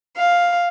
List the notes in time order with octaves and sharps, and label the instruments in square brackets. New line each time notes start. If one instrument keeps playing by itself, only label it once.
[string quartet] F5